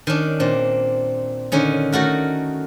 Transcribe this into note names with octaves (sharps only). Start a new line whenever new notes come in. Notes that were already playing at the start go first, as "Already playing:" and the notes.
D#3 C#4 D4
A#2 C4 D4
D3 D#3 C#4 D#4
D#3 A3 F#4 A#4